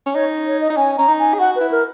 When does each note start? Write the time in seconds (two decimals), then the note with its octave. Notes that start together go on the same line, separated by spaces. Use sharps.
0.06 C#4
0.14 D#4 C#5
0.46 C#5
0.61 D#5
0.70 D#4
0.76 C#4 G#5
0.98 C#4 A#5
1.08 D#4
1.19 G#5
1.34 G#4
1.39 F#4 F#5
1.56 E4 B4
1.71 A#4